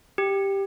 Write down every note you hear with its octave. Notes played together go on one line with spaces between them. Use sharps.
G4